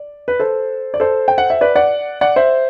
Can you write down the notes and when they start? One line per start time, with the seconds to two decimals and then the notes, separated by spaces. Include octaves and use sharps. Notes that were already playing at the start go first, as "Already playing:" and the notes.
Already playing: D5
0.28 B4
0.40 A4 C5
0.94 D5
1.00 A4 C5
1.28 G5
1.38 F#5
1.50 E5
1.61 B4 D5
1.76 D5 F#5
2.21 D5 F#5
2.36 C5 E5